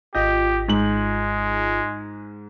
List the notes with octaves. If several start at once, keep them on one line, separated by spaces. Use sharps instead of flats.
G#1 F4 G4 D#5 G6
G#2 G#3 F#7